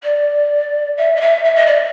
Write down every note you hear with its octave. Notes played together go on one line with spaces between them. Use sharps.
D5
E5
D#5
E5
E5
D#5
D5